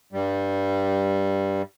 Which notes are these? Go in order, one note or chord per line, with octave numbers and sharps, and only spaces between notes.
G2 G3